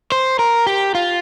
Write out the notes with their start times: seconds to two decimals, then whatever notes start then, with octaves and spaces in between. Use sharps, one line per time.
0.12 C5
0.39 A#4
0.67 G4
0.95 F4